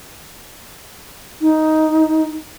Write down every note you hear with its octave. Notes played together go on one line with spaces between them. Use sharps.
D#4